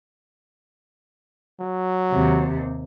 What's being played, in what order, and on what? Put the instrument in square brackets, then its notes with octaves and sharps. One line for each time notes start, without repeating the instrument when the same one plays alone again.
[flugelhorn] F#3
[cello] D#2 C3